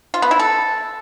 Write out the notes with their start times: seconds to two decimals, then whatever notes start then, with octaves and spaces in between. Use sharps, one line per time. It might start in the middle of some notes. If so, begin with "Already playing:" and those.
0.14 F4
0.22 B3
0.31 E4
0.39 A4